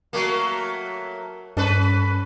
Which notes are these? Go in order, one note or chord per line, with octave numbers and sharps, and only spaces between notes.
F#3 A3 A#3
G2 C#4 A4 B4